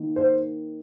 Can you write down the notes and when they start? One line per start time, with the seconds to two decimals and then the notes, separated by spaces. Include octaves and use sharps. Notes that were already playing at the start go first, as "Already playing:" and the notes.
Already playing: D#3 A#3
0.16 C5